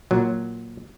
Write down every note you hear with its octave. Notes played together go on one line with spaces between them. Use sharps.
A#2 F#3